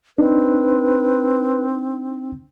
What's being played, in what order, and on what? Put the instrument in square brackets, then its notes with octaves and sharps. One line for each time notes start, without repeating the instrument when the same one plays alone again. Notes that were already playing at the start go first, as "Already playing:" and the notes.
[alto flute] C4 [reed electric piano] D4 D#4 [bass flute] B4